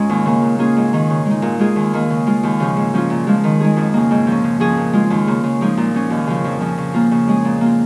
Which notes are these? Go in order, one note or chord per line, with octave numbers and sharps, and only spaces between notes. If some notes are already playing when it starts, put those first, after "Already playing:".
Already playing: G#2 G#3 C#4 F4 G#4
D#2
C#3 A#3
A#2
A#3 C#4 F4 G#4
G#2
D#3 C#4 F4
C#3
G#3 D#4
A#2
G#3 F4 G#4
D#2
D#3 A#3
C#3
G#3 F4
D#2
C#3 F3
G#2
F3 C#4 F4
A#2
F3 G#3 F4
D#3
G#3 D#4 G#4
F2
C#3 A#3
G#2
F3 C#4
C#3
F3 C#4 G#4
A#2
G#3 F4
D#2
C#3 A#3
C#3
F3 G#3 D#4
A#2
F3 C#4
D#2
C#3 F3
F2
C#3 F3
C#3
A#3 F4
C#3
G#3 C#4 G#4
A#2
A#3
F4